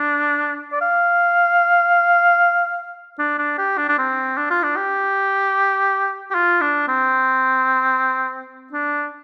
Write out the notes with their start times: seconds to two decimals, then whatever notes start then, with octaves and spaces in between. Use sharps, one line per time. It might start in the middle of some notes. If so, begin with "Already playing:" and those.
Already playing: D4
0.72 D5
0.81 F5
3.19 D4
3.38 D4
3.58 G4
3.78 D4
3.89 D4
3.99 C4
4.37 D4
4.50 F4
4.63 D4
4.77 G4
6.31 G4
6.35 F4
6.61 D4
6.88 C4
8.73 D4